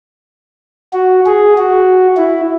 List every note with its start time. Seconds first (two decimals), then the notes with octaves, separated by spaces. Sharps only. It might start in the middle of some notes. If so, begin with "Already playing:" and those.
0.93 F#4
1.26 G#4
1.58 F#4
2.17 E4